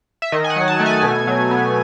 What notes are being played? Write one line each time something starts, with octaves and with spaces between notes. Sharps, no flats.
E5
D#3 D#5
G#5
F#5
F#3
A5
A3
G#5
B2
F#3
B3